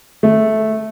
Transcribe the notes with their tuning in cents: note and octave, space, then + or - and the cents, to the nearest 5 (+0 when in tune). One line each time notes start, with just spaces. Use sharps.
A3 -10